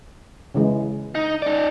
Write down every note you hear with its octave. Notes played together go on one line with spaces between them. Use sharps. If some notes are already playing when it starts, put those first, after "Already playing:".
C#3 E3 G#3
D#4
D#4 D5